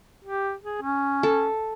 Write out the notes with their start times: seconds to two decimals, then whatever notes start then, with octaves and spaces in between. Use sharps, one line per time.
0.24 G4
0.64 G#4
0.82 C#4
1.23 A4